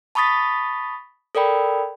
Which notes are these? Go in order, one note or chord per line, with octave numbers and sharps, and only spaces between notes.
A5 B5 C#6 D#6 A6 B6
A4 A#4 D5 G5 B5